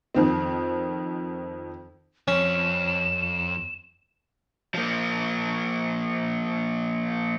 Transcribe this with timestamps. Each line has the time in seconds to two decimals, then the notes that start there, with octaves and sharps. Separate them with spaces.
0.15 F2 D#3 C4
2.28 F2 C#4 E7
4.74 F3 A#3